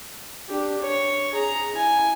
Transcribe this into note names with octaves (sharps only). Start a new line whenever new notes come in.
D4 G4
C#5
G#4 A#5
E4 G#5